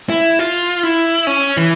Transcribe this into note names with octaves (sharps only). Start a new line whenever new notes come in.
E4
F4
E4
C#4
E3